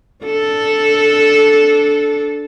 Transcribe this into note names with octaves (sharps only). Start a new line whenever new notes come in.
D4 A4